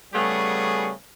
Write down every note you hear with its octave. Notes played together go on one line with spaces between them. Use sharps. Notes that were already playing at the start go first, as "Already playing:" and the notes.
C#3 G3 A3 B3 G#4